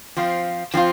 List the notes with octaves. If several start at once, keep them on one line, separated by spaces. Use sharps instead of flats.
F3 C4 F4
F3 C4 F4